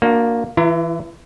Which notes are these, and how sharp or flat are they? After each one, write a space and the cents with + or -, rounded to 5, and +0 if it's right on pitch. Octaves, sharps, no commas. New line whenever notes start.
A#3 +0 D4 +0 F#4 -30
E3 +0 E4 +45 A#5 -10